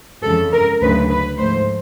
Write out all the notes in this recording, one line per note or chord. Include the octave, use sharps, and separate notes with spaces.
F2 C#3 E3 G#3 A4
A#4
D2 C#3 F#3 B4
B4
G#2 F3 A3 C5